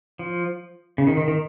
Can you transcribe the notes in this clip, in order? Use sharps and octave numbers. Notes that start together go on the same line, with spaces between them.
F3
C#3
D#3
D#3
D#3